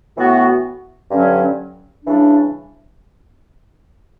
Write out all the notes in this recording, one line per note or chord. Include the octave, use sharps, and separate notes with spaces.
A2 E3 B3 F#4
G2 D3 F#3 C#4
C#3 E3 G3 D4